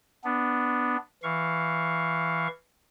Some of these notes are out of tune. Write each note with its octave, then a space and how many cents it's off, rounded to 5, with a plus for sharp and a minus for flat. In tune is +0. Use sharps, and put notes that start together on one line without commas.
B3 +0 D4 +0
E3 +0 F5 +0 C#6 +0